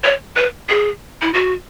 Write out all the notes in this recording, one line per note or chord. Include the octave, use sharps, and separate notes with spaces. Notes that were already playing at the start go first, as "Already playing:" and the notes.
C#5
B4
G#4
E4
F#4